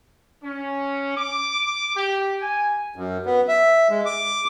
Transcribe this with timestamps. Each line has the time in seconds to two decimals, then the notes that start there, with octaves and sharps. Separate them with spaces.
0.44 C#4
1.17 D6
1.96 G4
2.41 G#5
2.96 F#2
3.26 B3
3.48 E5
3.90 G#3
4.06 D6